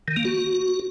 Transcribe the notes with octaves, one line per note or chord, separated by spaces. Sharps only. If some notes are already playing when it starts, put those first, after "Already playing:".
D#3
A#3
F#4